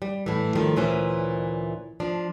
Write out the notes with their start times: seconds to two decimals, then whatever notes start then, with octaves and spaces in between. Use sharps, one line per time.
0.02 G3
0.26 A2 E3
0.55 D#3 F3 G3 A3
0.76 D2 A#2 E3 C#4 C5
2.00 F3 D4